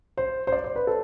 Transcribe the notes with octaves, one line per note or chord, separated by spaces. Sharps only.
C5
C5
D5
C5
B4
A4